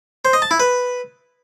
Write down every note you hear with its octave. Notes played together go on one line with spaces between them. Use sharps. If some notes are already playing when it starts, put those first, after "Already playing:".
C5
D#5
A5
E4
B4